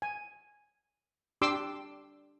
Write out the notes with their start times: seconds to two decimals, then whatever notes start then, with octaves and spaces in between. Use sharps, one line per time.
0.02 G#5
1.42 D4 G4 C6 D6 E6